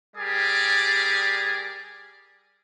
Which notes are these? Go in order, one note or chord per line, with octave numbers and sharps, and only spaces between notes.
G3 G4 G#4 A#4 D5